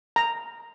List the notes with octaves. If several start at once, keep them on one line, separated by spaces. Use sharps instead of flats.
A#5